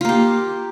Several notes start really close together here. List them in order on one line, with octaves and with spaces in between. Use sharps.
F4 A#3 G4